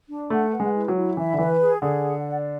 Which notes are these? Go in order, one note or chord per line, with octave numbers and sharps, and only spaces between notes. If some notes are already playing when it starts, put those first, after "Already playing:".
D4
A3 F#5
B4
G#3
E4
F#3
E4
E3 E5
D3
E3 B4
G#4
D3 G#4
F#5
D5